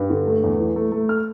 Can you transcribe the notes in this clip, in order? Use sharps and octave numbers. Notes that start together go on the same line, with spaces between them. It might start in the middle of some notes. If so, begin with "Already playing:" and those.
Already playing: G2
D3
A3
E2
E3
A3
A3
F6